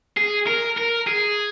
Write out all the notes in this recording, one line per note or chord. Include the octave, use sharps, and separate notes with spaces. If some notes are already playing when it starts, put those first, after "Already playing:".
G#4
A#4
A#4
G#4